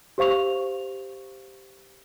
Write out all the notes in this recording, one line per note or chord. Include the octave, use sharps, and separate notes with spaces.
G4 C5 F5 C#6 F7